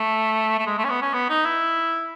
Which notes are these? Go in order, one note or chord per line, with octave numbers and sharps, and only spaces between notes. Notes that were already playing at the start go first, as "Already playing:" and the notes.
Already playing: A3
A3
G#3
A3
C#4
B3
C#4
B3
D#4
E4